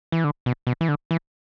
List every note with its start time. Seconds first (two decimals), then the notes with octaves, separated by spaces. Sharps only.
0.12 E3
0.24 D3
0.46 B2
0.67 B2
0.81 E3
0.89 D3
1.11 E3